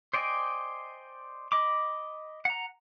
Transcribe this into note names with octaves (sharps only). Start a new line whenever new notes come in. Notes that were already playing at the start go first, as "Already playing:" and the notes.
C5 D5 D#5 G5 G#5
D#5 B5 D6
F#5 A#5